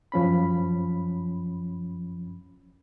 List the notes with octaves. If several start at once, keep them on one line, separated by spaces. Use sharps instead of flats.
F#2 F3 C#4 B5